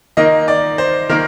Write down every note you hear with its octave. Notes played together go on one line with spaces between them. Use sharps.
D#3 A#3 D#4 D#5
D5
C5
D#3 A#3 A#4